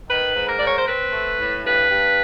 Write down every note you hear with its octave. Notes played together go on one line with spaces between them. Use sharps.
D#3 B4
G#2
A#4
G#2 D5
C#5
C5
C4 B4
A3
A2
G2 B4
G2